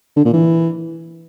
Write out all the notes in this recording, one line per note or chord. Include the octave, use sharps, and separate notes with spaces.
D3
A#2
E3